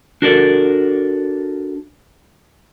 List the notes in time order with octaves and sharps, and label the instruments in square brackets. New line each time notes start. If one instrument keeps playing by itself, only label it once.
[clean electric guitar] D4 F#4 A4 A#4 D5